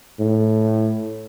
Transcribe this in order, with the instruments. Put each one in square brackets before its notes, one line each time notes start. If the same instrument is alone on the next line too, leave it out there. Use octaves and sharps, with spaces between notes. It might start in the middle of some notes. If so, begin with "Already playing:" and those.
[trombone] A2